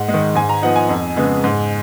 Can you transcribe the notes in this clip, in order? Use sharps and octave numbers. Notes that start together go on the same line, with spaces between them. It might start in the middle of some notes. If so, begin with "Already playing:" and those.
Already playing: G#2 F#5
G#3
D#3
G#2 G#5
A#5
F3 B3 D#4 F#5
G#5
F2
C#3 G#3 B3
G#2